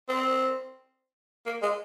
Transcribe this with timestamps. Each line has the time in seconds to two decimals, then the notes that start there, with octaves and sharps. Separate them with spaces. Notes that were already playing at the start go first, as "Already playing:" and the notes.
0.09 C4
1.46 A#3
1.62 G#3